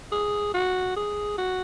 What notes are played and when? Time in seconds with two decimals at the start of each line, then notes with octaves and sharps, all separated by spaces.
0.12 G#4
0.54 F#4
0.96 G#4
1.38 F#4